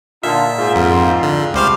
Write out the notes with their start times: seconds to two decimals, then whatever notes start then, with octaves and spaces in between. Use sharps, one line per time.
0.23 A#2 D3 D#4 F4 E5
0.59 G#2 F4
0.76 F2 F5
0.93 C4
1.23 D3
1.54 C#2 G3 A3 C5 F5